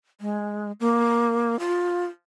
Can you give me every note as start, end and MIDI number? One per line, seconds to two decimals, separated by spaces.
0.21 0.72 56
0.80 1.59 58
1.59 2.05 65